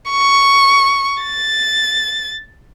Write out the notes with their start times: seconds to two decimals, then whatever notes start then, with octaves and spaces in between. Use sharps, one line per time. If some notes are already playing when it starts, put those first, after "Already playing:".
0.11 C#6
1.23 A6